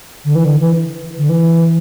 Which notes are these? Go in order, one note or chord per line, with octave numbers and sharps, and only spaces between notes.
D3
E3
D3
E3
D3
E3